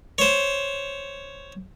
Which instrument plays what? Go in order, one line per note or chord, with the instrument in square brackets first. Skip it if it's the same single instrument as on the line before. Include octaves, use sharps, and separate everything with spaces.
[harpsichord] C5 C#5